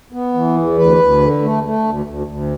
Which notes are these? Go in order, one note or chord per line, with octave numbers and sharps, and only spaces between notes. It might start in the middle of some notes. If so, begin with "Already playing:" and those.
B3
E3
E2
D2 B4
D2
D3
A3
A3
D2
D2
D2